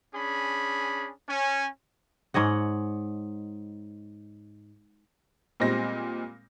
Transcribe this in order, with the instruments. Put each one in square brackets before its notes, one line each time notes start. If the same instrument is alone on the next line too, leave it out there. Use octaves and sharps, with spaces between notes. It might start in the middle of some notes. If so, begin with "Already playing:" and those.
[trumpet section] C#4 D4 G#4 B5
C#4 G#5
[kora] G#2 C#5 D#5 F#5
[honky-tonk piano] A#2 G3 G#3 C4 A#6